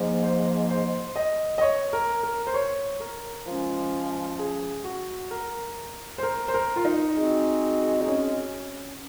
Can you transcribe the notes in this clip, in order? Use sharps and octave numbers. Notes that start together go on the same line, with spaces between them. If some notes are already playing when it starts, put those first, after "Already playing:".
Already playing: G#2 F3 A#3
C5
C5
D#5
D#5
C#5
A#4
A#4
C5
C#5
A#4
F3 G#3 C#4
G#4
F#4
A#4
C5
A#4
C5
A#4
F4
D#4
G#3 C4 F#4
D#4
C#4